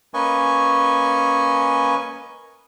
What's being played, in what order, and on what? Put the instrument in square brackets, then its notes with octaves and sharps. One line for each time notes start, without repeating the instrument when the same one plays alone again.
[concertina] A#3 C#4 B4 D#5 G#5 C#6